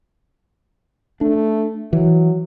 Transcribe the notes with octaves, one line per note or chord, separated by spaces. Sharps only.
A3 D4
E3 F#3